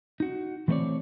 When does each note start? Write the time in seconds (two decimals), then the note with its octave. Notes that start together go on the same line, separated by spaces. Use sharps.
0.20 D#4 F#4
0.68 E3 A3 C4 B4 C#5 D5